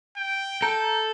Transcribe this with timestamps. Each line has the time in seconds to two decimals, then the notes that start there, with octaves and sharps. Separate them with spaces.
0.17 G5
0.62 A4 A#5 G6